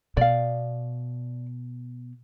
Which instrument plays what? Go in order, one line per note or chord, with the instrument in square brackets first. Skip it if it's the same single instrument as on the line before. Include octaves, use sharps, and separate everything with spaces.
[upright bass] B2 [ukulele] D5 F5